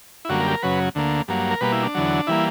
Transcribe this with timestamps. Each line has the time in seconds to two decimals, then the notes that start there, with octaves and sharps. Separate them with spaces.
0.25 E4
0.29 F#2 D3 G3 A#3 F#4
0.40 A#4
0.47 G4
0.51 A#4
0.62 F#2 C#3 F#3 B4
0.95 D2 D3 A#3
1.28 G2 F#3 A#3
1.51 A#4
1.61 B2 G3 A#3 B4
1.72 E4
1.83 D4
1.95 E2 D3 F#3
2.27 E3 G3 A#3 E4